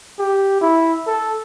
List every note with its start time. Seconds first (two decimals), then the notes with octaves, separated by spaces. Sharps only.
0.19 G4
0.61 E4
1.07 A4